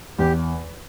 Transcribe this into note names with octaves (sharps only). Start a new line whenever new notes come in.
E2 G4